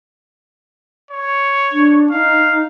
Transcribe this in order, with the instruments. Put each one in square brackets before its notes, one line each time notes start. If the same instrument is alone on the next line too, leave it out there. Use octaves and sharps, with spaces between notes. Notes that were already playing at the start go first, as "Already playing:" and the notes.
[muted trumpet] C#5
[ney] D4
[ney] D#4 [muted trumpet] F5